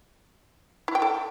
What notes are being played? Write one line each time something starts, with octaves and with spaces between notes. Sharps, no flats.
E4
G5
A4